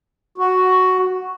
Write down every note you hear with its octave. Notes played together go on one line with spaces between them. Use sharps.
F#4